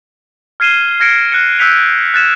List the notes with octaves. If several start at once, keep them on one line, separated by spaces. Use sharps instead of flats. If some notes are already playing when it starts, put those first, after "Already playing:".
F6 G#6 C7 D#7 E7 G7
F6 G#6 A#6 C#7 D7
F#6 A#6 C#7
E6 F#6 G6 B6 C#7 F7
F#6 G#6 A6 B6 E7